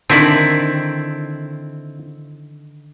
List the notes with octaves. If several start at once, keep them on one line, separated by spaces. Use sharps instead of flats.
D3 D#3 C4 E4 D5